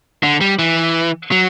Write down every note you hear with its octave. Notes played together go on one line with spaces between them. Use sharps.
D3
G3
E3
F#3